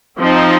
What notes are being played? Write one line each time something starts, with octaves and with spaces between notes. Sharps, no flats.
F3 C4 D#4